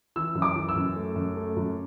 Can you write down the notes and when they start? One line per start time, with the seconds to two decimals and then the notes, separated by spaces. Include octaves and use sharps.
0.16 E3 E6
0.35 F#2
0.42 D6
0.56 E3
0.69 E6
0.76 F#2
0.96 A3
1.16 F#2
1.36 A3
1.56 F#2